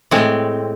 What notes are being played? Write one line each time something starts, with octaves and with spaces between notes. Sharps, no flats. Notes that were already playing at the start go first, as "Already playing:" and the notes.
A2 G#3 C4